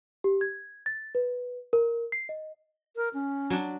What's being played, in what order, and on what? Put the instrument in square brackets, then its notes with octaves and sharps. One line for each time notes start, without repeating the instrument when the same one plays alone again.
[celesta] G4
G#6
A6
B4
A#4
C7
D#5
[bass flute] A#4
C#4
[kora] F#3 D4